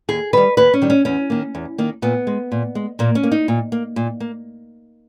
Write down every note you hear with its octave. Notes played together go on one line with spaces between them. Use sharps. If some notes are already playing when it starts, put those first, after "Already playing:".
D#2 G#4
D#3 G3 B4
D#2 B4
C#4
D#3 G3
C#4
E2 C#4
D#3 A#3
E2
D#3 A#3
A#2 B3
G#3
A#2
G#3
A#2 A#3
C#4
A#3
D#4
A#2
A#3
A#2
A#3